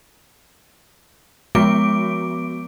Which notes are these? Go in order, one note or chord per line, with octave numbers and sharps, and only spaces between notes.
F3 G#3 B3 F#4 D6 D7